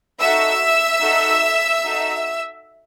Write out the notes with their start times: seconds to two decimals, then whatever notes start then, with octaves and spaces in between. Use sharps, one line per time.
0.20 D#4 F#4 A4 E5 E6
1.01 D#4 F#4 A4
1.82 D#4 F#4 A4